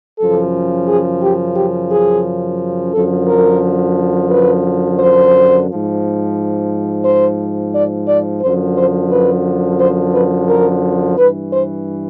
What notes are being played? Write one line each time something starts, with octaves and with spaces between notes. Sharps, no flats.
F#2 C#3 F3 A4
G#4
G4
G4
G#4
F#2 D3 F3 A4
A#4
B4
C5
G#2 F3
C5
D5
D5
F#2 D3 F3 C5
C5
B4
C5
B4
A#4
G2 E3 B4
C5